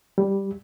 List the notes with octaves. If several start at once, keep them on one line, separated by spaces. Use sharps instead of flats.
G3